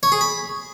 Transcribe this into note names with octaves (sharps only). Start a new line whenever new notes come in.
C#5
G#4
B5